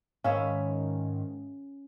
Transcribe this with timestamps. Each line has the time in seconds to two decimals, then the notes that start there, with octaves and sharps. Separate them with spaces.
0.24 G#2 D#3 C#4 G#4 E5 F5 B5